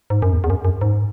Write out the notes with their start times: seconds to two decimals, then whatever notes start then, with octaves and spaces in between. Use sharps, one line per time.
0.10 G#2
0.22 F#2
0.33 E2
0.44 E2
0.50 F#2
0.65 F#2
0.81 G#2